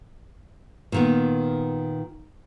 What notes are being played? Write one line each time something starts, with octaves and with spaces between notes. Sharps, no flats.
A#2 D#3 B3